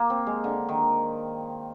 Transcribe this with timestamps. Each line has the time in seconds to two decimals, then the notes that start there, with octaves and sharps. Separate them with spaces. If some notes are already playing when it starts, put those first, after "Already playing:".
Already playing: A#3
0.10 C4
0.27 G#3
0.44 D3
0.69 D#3